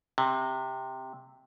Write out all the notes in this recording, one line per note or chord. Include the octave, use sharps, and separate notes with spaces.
C3